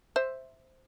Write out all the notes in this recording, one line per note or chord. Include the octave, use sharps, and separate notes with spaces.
C5 E5